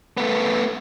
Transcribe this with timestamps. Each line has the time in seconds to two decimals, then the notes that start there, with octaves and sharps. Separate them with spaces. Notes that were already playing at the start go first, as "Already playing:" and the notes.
0.17 A3 B3